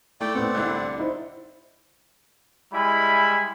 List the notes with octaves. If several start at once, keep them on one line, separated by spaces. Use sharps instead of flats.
A3 E4 D5 G5
A2 B3 C4 D5 F#5
C2 D3 D4 E4 F#6
D#4 E4 C5
G3 G#3 E4 G#5 B5